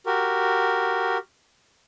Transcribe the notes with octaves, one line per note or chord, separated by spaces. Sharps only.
F#4 G4 A#4